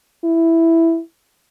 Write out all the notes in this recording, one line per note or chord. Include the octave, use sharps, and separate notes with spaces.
E4